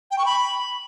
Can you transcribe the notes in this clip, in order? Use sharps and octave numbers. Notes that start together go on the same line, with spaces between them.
G5
C#6
B5